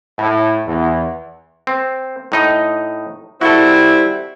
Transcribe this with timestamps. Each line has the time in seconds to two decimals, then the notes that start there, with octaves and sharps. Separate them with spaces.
0.19 A2
0.66 E2
1.67 C4
2.32 A2 D#4 D#5
3.41 G3 C4 E4 F#4 A4